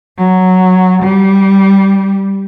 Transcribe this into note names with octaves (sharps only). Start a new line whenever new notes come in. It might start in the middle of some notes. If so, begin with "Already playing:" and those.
F#3
G3